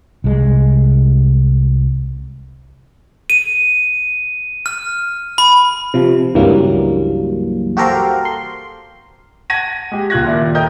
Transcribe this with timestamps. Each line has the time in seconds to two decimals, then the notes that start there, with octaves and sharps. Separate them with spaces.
0.24 C2 G#3
3.30 D#7
4.66 F6
5.38 B5
5.94 C3 F3
6.35 C#2 G2 E3 F#3 G3 A#3
7.77 F#4 G4 A4 A#4 C5 F5
8.25 C6
9.50 F#5 A5 G#6 A#6 D#7
9.92 G#3 G4
10.10 C#2 A#2 F4 F#6 G#6 A#6
10.24 D#2 A#2 E4 D5 E5
10.55 A4 A#4 D#5 G5 A#5 G6